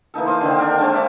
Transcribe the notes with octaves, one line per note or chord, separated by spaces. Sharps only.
E3 A#3 D#4 A4
C5 D#5 F5
D3 D#3 C4
D4 A#4 G5
G#3 C4
A#3 C#5 D5 E5